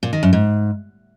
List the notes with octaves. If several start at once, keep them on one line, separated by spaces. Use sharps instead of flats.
A#2
D#3
F#2
G#2